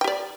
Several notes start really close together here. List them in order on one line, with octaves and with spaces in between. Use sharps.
G5 G4 D5